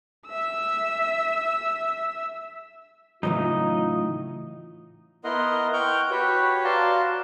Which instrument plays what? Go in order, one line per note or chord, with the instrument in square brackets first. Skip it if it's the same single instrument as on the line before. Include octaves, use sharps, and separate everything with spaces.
[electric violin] E5 E6
[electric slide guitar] A2 [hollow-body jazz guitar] C#3 E3 F#3 [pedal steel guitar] D#4 D#5 [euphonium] F4
[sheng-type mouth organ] B3 E4 A#4 D#5 F#5 C6
F#5 G5 C#6 F6 G6
F#4 G4 B4 C#5
F#4 D5 F5 A5 A#5 C6